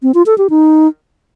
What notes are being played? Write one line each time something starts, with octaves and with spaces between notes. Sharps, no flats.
C4
F4
A4
G4
D#4